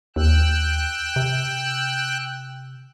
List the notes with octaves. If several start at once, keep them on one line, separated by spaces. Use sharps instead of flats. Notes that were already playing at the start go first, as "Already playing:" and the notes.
D#2 G5 E6 F#6
C3